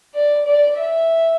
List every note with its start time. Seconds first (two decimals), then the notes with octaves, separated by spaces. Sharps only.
0.14 D5
0.45 D5
0.77 E5